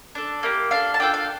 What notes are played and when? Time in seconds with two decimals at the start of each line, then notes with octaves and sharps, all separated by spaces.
0.15 D4 A4
0.43 A#3 E4 G4
0.71 D4 A4 F5
0.94 A5
1.00 D4 F4 A4 G5
1.14 F5